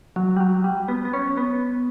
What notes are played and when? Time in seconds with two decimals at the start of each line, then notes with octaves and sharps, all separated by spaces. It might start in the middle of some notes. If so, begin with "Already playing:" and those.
0.16 F#3
0.37 G3
0.40 F#3
0.64 G3
0.88 B3
1.05 B3
1.13 C#4
1.37 B3